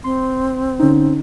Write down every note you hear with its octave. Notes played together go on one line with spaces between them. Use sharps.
C4 C6
D3 C#4 D#4